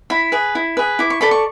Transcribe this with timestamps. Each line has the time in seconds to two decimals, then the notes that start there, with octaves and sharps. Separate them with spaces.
0.10 E4 B5
0.32 G#4 B4
0.55 E4
0.77 G#4 B4
0.99 E4 D6
1.10 C#6
1.21 A4 D5 B5
1.31 C#6